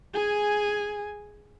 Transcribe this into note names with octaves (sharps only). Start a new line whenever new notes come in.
G#4 G#5